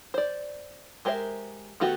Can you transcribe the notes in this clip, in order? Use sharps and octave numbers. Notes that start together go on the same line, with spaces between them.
C5 D5
G#3 G4 A#4 C5 E5
D#3 A3 B3 F#4 G4